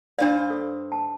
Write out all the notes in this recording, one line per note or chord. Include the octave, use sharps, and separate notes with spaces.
G2 D4 C5 D5 F5
A4
A5